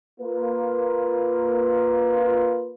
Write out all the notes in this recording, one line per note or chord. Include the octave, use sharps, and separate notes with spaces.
A#3 F4 B4